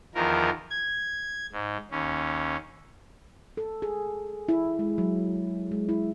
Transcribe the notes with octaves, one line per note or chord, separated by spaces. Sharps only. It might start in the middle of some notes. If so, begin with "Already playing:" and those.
E2 D#3 F3 A#4
G#6
G#2
D#2 C#4
A4
G#4
E4
G#3
F#3
G#3
E4